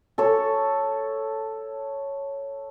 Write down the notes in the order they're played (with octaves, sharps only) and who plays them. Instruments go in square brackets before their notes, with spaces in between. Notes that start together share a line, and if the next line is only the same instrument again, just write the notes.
[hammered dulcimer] A4 C#5